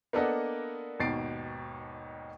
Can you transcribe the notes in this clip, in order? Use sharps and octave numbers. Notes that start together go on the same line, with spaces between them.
A#3 B3 D4 A4 D#5 F#5
G#1 D#2 B2 A6 C7 D7